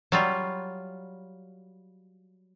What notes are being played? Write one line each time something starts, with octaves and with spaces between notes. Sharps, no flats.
F#3 G3 F4